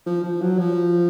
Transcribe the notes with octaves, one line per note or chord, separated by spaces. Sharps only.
F3
F3
F#3
F3